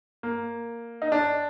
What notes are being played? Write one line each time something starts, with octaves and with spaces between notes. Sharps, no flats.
A#3
D#4
D4